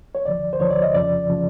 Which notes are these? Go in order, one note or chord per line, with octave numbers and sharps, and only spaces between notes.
C#5
D2 D3 F3 D5
C5
D2 D3 F3 C#5
D5
D#5
F2 C#3 F3 D5
C#3 F3